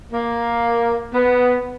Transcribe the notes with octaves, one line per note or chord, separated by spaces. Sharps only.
A#3
B3